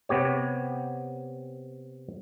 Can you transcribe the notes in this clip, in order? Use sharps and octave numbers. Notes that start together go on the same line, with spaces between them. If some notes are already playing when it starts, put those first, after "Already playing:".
C3 B3 G4 C#5